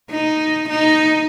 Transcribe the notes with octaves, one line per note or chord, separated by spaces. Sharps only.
D#4
D#4